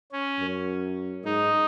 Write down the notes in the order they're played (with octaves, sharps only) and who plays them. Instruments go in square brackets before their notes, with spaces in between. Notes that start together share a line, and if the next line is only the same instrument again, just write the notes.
[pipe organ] C#4
[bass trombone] F#2
[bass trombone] G#2 [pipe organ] D#4